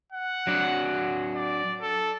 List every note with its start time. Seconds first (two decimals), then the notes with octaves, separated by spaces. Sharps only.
0.12 F#5
0.47 F#3 D4 F#4
1.36 D5
1.81 A4